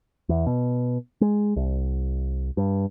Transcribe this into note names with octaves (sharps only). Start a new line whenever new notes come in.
E2
B2
G#3
C2
G2